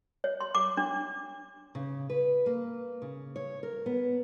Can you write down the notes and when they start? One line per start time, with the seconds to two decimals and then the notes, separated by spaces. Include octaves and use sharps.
0.24 C#5
0.41 C6
0.55 D6
0.77 D4
1.75 C#3
2.10 B4
2.46 A#3
3.02 C#3
3.36 C#5
3.63 A#4
3.86 B3